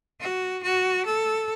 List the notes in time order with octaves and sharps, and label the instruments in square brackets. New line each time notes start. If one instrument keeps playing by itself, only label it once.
[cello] F#4
F#4
A4